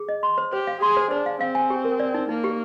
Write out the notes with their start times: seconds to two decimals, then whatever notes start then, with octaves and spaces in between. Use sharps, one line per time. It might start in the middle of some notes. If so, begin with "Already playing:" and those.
Already playing: G#4
0.09 D#5
0.23 C6
0.38 C5
0.53 G4 C5
0.67 F5
0.82 G#4 C6
0.97 C5
1.11 D4 C5
1.26 F5
1.41 C4 F5
1.55 G#5
1.70 G4
1.85 A#4
2.00 D5
2.14 D#4
2.29 A#3 D#4
2.44 G4